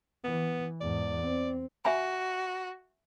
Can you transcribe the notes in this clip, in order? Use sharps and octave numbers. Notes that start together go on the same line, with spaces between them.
E3 B3
E2 G#2 D5
C4
F#4 E5 G#5 B5